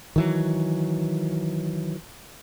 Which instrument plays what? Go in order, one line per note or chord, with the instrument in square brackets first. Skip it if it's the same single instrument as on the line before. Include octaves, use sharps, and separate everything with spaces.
[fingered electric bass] D#3 E3 F#3